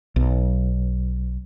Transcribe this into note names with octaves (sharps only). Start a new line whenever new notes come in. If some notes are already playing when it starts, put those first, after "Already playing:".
B1